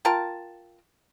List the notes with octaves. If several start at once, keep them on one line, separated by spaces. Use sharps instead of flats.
F4 A#4 G5 A5